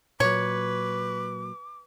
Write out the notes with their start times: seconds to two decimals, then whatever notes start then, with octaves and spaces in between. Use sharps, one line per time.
0.20 A#2 F#3 B4 C#5 D6